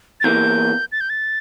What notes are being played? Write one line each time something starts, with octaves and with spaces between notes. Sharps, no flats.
A6
E2 E3 A#3 G6
A6
G6
A6